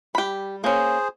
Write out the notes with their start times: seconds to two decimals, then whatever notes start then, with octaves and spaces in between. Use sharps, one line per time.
0.15 G3 G4 B5
0.64 A#3 C#4 G#4 C5